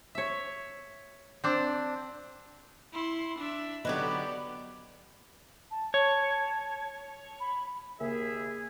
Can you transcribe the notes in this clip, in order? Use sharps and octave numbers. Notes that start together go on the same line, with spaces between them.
C#5 E5
C4 D4
E4 C6
D4 E5
D3 F#3 B3 D#4 G4 B4 D5
A5
C#5 A5
B5
D#2 C#3 A#3 G#4 A#4 E5